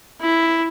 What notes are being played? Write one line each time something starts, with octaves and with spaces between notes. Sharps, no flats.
E4